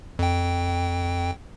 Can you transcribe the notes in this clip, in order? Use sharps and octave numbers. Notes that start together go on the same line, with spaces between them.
F2 G5